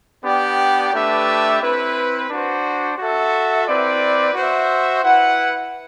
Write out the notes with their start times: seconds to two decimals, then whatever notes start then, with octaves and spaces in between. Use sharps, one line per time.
0.24 B3 D4 G4 D5 G5
0.92 A3 D4 G4 B4 E5
1.61 C4 E4 B4
2.29 D4 F#4 C5
2.98 F#4 A4 E5
3.66 C4 E4 B4 D5
4.35 F#4 C5 E5
5.03 E4 B4 F#5